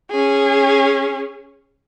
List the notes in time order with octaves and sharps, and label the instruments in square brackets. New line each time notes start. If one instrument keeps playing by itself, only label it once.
[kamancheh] C#4 G#4